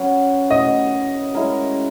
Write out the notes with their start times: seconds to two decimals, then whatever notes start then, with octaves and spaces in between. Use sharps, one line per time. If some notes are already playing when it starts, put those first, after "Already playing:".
Already playing: F#3 C#4 F#4 B4
0.51 D#5
1.34 G#3 C#4 E4 A#4